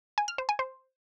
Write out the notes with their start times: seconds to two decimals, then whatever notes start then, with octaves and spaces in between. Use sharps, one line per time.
0.18 G#5
0.28 F6
0.38 C5
0.49 G#5
0.59 C5